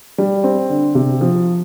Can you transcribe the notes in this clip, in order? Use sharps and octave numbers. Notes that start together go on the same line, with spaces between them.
G3
C4
D3
C3
F3